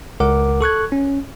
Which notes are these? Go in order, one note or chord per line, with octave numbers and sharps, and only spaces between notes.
C#2 A#4 F#5 D6
A4 C#6 F#6 G#6
C#4